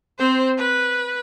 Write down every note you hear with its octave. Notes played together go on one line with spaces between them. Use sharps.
C4 C5
B4